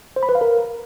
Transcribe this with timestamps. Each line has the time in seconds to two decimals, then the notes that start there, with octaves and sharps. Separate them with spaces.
0.16 C5
0.23 B5
0.29 B4
0.35 F5
0.41 A#4